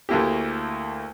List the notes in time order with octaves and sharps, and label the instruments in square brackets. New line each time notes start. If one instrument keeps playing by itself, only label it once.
[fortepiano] D2 A3 A#3 E4 G4